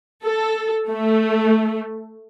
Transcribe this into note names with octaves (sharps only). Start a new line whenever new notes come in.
A4
A3